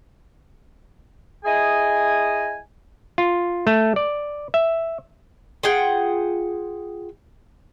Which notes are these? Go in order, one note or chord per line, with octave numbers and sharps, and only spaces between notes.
E4 G#4 D#5 G#5
F4
A3
D5
E5
F4 G#4 F#5 G5